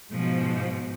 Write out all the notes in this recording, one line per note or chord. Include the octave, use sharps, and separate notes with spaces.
G#2 B2 F3